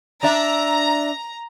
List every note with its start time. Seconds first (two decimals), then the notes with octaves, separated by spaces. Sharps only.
0.23 D4 D5 E5 A#5